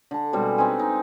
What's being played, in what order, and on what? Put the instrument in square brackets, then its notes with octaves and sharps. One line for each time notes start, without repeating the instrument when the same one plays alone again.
[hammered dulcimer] D3 A5
B2 G3 G#3 C4
C4 D#4 B4 G#5
D#4